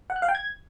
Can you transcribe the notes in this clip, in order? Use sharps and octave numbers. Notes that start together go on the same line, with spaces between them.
F#5
F#6
F5
G5
G#6